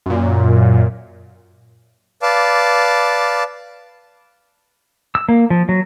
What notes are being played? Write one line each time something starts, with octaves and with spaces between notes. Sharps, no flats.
F#2 A#2
B4 D5 F5 A5 D6
E6
A#3
F3
F#3